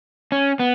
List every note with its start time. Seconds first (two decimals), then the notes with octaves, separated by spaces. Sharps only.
0.32 C#4
0.59 B3